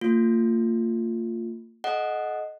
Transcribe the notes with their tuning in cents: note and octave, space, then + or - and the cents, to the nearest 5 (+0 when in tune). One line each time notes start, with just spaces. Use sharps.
A#3 -40 F4 +5
A4 -35 D#5 +0 F#5 +0